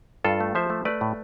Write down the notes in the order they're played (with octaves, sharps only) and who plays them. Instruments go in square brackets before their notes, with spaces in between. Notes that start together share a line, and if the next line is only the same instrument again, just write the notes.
[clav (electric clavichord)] G2 F4 A4
A3
F3 C5 E5
A3
A3 B4 D5
A2